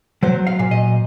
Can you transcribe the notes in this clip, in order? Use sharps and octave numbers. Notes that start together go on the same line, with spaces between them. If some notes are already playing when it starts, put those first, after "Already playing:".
F#3 C5
F5
A#2
D#5